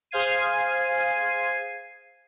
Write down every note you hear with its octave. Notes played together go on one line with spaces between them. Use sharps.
G#4 C5 F5 G#6 C7 D#7